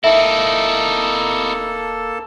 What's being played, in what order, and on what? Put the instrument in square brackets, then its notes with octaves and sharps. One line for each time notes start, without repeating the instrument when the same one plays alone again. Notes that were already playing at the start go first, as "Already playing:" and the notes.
[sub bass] D1 [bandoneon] A#3 A4 A5 [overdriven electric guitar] D#4 E4 [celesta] E5